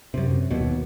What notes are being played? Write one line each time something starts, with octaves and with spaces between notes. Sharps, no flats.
F#2 C3
D#2 B2